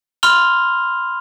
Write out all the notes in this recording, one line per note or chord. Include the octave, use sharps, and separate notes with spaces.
B5 C6 F6 F7 G7